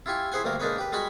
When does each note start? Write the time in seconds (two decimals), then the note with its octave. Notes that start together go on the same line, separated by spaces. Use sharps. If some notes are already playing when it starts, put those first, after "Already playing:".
0.06 E4 F4 G4 G#5 C#6
0.32 E4 G#4 C5 F#5 G#5
0.44 D2 G2 A3 A#3 A#4
0.60 G#3 A#3 D4 D#4 B4 C#5
0.78 G4 B4
0.92 G3 G#3 F#4 G#5 B5 C#6